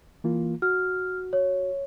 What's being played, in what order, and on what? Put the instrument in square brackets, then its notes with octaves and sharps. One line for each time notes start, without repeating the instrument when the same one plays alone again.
[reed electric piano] E3 A#3 F4
[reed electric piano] F#4 [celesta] F6
[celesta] C#5